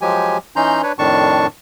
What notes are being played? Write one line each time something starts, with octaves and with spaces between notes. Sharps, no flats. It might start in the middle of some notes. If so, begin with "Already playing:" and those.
F3 F#3 G#3 G4 G#5
E3 C#4 D#4 A#5 C6 G6
D4 B4 C#5
F2 A2 D#3 D4 A5 C#6